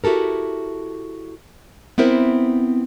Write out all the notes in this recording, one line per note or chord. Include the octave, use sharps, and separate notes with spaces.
E4 F#4 G4 A4 A#4
B3 C4 E4 A#4 C5